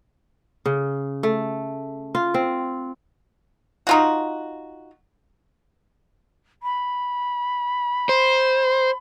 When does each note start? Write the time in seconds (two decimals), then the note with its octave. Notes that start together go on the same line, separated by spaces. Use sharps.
0.66 C#3
1.23 A3
2.15 F4
2.34 C4
3.87 D#4 F4 F#4
6.63 B5
8.09 C5